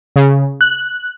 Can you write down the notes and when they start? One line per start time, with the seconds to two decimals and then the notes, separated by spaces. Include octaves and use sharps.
0.16 C#3
0.61 F#6